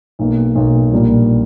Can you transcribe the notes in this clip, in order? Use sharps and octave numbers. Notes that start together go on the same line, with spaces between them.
B1 B2 A#3
B1 B2 A#3
A#1 A#2 G3 A#3